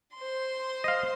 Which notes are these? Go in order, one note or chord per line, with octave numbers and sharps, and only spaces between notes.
C5 C6
D#5 F5